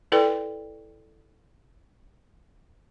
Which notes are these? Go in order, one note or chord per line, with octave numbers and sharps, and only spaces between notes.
E4 A4 B4 D5 G5